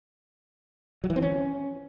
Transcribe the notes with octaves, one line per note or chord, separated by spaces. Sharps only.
F#3
E3
C4
C#4